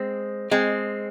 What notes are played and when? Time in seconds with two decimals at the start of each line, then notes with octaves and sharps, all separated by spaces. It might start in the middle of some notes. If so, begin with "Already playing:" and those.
Already playing: G#3 C4
0.51 G#3 C4